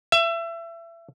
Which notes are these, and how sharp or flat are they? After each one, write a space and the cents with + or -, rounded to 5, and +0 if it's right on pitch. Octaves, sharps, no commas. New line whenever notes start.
E5 +30